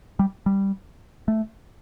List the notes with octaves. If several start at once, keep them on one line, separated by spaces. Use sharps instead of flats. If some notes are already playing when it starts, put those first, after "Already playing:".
G3
G3
A3